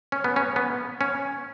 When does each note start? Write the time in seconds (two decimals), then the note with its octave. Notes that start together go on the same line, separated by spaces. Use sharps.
0.12 C#4
0.24 B3
0.36 C#4
0.56 B3
1.01 C#4